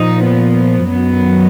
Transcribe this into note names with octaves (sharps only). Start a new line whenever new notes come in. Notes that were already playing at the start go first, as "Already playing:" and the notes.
Already playing: A#2 F3 D#4
B3
F#2 D#3 F#3 B3